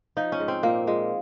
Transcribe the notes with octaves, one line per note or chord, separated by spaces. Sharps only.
F3 D#4
C#4
G#2
C4
A#2 A#3
A#2 G#3